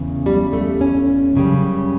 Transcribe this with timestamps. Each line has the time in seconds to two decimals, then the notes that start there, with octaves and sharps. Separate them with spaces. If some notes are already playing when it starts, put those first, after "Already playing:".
Already playing: E2 C#3
0.26 G3
0.53 A3
0.81 C#4
1.35 F#2 C#3 G3